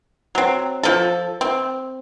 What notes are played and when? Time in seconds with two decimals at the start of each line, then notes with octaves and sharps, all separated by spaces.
0.35 F#3 C4
0.83 F3 A4
1.41 C4